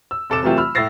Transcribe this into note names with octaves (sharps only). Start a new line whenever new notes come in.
E6
F1 A4 D6 E7
C3 E3 F#3 A3 F4 G4
B5 E6 F6
A2 E4 E6 A6 A#6 C7